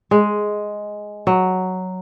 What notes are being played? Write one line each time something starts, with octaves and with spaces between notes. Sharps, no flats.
G#3
F#3